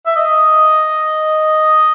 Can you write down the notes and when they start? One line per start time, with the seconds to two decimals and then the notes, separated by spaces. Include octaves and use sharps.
0.06 E5
0.16 D#5